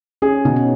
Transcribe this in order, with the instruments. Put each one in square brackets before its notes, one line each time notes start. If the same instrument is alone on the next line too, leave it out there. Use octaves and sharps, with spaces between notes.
[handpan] C#4 [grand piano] G#4
[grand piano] B2 [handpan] D#4
[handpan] C#4